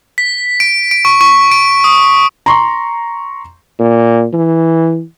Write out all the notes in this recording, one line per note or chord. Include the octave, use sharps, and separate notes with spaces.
B6
D7
D7
C#6
C#6
D7
D#6
A#5 C6 C#6
A#2
E3